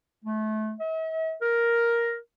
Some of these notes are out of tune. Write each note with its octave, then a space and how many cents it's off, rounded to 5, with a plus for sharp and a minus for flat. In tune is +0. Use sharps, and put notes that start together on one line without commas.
A3 -25
E5 -45
A#4 +5